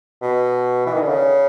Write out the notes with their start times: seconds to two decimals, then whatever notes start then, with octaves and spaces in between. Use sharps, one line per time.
0.22 B2
0.86 E3
0.94 D#3
1.01 D3
1.09 C#3